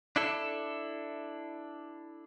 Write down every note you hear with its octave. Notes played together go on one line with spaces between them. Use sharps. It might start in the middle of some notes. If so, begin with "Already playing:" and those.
D4 E4 A4